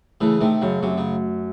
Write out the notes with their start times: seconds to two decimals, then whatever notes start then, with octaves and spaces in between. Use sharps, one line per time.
0.21 C#3 E3 A3
0.41 C3 D#3 A3
0.62 F#2 C#3
0.82 F#2 C3
0.98 C#3